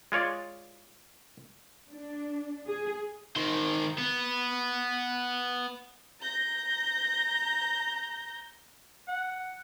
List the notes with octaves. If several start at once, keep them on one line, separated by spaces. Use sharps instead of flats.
G#3 F4 C#5 D5
D4
G#4
D#3 C5
B3
A#5 G6 A#6
F#5